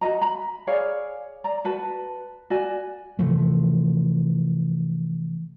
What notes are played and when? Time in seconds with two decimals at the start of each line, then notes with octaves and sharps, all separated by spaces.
0.01 F#4 A#4 D#5 A#5
0.21 A#5 B5
0.67 G#4 C#5 D5 F5
1.44 D5 A#5
1.65 F#4 B4 A5
2.50 F#4 D5 G#5
3.19 C3 E3 F3 A3